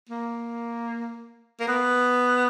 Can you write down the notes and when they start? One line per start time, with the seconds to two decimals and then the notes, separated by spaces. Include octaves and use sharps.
0.09 A#3
1.60 A#3
1.68 B3